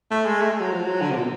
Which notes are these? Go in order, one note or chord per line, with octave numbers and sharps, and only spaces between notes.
A3
G#3
A3
G#3
F#3
F3
F#3
D3
C3
A#2
B2